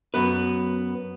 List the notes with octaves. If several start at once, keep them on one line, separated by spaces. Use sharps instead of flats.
F#2 B3 B4